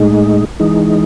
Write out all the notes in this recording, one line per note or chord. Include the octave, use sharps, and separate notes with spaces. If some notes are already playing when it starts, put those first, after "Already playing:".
Already playing: A2 G#3 D#4
E3 G#3 D#4